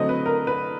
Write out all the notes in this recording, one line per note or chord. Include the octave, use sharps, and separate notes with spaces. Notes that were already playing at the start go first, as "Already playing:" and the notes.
Already playing: D3 F#3 A3 C4 D#5
B4
A#4
B4